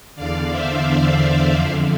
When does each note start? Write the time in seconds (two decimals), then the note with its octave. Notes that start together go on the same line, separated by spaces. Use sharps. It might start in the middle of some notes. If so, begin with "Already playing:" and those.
0.16 E2 D3 D5 F5
0.49 C5 E5
0.84 D5 F5
1.54 F2 D3